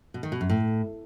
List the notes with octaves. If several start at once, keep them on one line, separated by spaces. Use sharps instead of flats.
B2
D#3
B2
F#2
A2